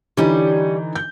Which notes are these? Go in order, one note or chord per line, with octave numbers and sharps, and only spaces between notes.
D3 E3 G3 C#4 D#4
G6